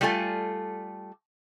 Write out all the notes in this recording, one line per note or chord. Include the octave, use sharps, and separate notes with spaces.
G3 A3 F4 A4 G#5